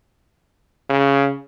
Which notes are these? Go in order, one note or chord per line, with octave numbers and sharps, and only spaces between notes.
C#3